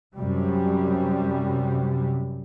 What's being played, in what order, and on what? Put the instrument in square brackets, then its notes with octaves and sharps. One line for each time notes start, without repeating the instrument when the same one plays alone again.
[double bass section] F#2 C3 G3